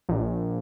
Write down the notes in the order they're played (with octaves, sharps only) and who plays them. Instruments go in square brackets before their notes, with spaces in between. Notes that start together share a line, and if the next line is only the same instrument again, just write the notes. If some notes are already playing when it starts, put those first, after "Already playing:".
[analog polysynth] A#1